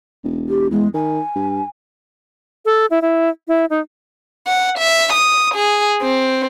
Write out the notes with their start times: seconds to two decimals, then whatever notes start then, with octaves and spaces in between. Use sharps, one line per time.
0.24 E1
0.48 G4
0.71 E2 G#3
0.94 D#3 G#5
1.35 G2
2.65 A4
2.91 E4
3.02 E4
3.48 E4
3.70 D#4
4.47 F#5
4.78 E5
5.13 D#6
5.54 G#4
6.02 C4